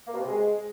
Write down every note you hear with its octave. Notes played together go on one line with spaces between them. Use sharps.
A#3
B2
C3
G#3